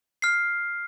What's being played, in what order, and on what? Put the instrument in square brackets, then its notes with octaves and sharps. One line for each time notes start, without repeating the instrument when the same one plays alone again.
[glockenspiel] F6 C7